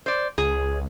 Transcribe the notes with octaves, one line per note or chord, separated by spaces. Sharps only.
C5 D5
C#2 G#4